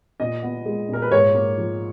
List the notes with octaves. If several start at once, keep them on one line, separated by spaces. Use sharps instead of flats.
A#2 D#5
B3
G#3
A#2 A#4
B4
G#2 C#5
A#3
F3